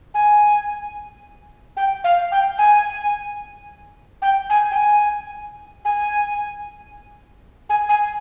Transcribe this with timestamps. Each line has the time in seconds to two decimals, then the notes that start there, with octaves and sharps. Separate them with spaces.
0.14 G#5
1.77 G5
2.04 F5
2.32 G5
2.58 G#5
4.22 G5
4.50 G#5
4.71 G5
4.76 G#5
5.85 G#5
7.70 G#5
7.89 G#5